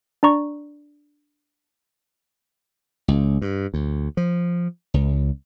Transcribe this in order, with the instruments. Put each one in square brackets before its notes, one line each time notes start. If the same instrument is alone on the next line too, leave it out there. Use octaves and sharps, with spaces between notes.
[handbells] D4 D5 A#5 C#6
[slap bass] C#2
G2
D2
F3
C#2